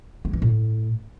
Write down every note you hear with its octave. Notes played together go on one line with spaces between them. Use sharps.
G#3
E3
A2